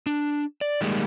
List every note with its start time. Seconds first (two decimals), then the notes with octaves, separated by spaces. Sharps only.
0.06 D4
0.61 D5
0.81 D#3 G3 G#3 A#3